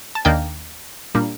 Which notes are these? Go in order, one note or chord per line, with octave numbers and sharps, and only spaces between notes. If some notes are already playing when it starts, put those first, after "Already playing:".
A5
D#2 D#3 A#3 D4 G5
A#2 G3 A#3 D4